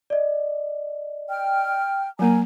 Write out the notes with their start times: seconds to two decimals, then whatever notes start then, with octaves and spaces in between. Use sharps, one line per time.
0.10 D5 D#5
1.29 G5 F6
2.19 F#3 A#3 A#4 G#5 A#5